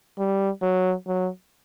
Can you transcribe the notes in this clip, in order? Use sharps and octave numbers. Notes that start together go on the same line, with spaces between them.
G3
F#3
F#3